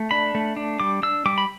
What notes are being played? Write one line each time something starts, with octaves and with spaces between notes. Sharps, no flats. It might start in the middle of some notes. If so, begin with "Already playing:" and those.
Already playing: A3
D4 B5
A3
D4
G3 D6
D4 E6
G3 D6
B5